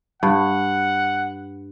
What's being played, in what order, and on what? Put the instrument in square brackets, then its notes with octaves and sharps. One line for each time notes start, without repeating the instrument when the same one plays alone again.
[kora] G2 [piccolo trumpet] F#5